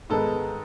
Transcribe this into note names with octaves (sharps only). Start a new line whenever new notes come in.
G#2 D#3 G#3 B3 A4